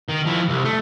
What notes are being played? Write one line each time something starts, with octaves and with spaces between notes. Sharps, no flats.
D#3
F3 E4
C2
A3